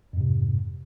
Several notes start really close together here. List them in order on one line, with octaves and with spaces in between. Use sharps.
F2 G#2 C3